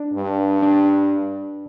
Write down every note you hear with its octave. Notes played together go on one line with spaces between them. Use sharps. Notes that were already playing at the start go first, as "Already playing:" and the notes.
Already playing: D4 D5
G2
D4 D5